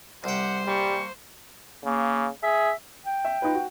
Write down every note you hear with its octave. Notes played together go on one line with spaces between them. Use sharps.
C2 G4 C5 F#5 G5
G3 A#3 G#5 C#6
C#3 A#3
G#4 E5
G5
E5
D#4 F4 B4
F#4